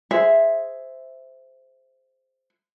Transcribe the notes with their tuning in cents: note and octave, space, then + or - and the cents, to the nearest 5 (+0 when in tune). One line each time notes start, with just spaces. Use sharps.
G#4 +0 C5 -5 E5 +0